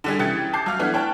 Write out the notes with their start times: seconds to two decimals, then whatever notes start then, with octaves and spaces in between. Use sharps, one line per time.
0.04 D3 G3 G#4
0.19 C#3 E3 G4 G#6 A6 C#7
0.53 A5 D6 G6 C7
0.66 F#3 F5 F6
0.79 E3 A3 B3 D4
0.94 C#5 G5 A5 F#6